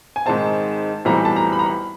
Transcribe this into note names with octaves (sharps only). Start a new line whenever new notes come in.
G#5
G#2 D#3 G#3 C4 A5
B1 A2 E3 G3 C4 A#5
A5
A#5
B5
A#5
B5